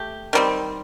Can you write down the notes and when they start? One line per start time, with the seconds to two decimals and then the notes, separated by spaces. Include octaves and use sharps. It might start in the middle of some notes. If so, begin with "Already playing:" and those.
Already playing: A3 G4
0.33 D#3 G3 C4